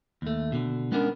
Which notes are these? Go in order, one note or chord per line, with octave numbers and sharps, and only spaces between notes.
D#2 A3
B2 D3
G#3 B3 C#4 D4 G4 A#4